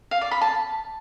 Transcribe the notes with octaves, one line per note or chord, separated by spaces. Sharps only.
F5
D5
B5
A5